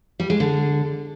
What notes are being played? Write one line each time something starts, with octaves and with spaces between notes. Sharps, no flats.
G3
G#3
D3